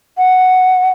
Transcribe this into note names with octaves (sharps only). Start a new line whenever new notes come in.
F#5